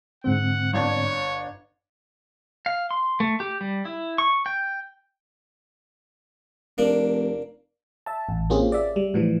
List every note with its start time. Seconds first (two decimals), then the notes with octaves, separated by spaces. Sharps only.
0.24 G#2 D3 C4 F#5
0.74 G1 D4 C#5 G#6
2.66 F5
2.91 C6
3.20 A3
3.40 G4
3.61 G3
3.85 E4
4.18 C#6
4.46 G5
6.78 F1 A#3 D4
8.06 E5 A5
8.29 A1
8.50 A#3 C4 C#4 F4 G4 G#4
8.72 D5 E5
8.96 G3
9.14 A2 E3 F3